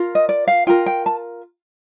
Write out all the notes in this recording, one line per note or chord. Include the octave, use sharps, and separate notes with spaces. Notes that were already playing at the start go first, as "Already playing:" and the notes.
Already playing: F4 A#4
D#5
D5
F5
F4 A#4 G5
G5
A5